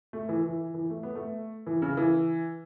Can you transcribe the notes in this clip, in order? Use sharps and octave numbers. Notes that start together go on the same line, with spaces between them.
A3
E3
E3
E3
A3
B3
A3
E3
C#3
E3